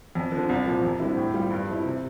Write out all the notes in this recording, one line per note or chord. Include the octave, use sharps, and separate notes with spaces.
F2
D3 F3
C2
A#2 F3
F2
D3 G3 C4 E4
A2
G3 C4 F4
G2
F3 C4 E4
C3